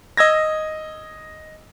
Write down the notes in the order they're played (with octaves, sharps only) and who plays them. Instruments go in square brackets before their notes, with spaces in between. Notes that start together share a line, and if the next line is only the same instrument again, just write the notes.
[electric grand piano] D#5 E6 G#6 A#6